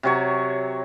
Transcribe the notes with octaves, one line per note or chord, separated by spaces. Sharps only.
C3 F#3 C#5